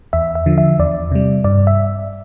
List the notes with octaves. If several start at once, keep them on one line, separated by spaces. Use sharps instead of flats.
E2 E5
E5
D3 F3
E5
E2 D5
C3 G3
G2 D5
E5